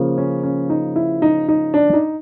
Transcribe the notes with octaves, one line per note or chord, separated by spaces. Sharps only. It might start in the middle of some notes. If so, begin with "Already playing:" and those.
Already playing: C#3 F3 A#3
C#4
C#4
D#4
E4
D#4
D#4
D4
D#4